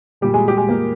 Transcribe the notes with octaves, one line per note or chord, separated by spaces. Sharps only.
A#2 G3 G#3 G4
G#3 G#4
G4
G#3 G#4
A#2 G#3 A#3 A#4